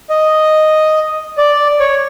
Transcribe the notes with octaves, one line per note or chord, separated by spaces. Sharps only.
D#5
D5
C#5